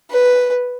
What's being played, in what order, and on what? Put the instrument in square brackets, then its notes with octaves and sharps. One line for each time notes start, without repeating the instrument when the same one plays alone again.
[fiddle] B4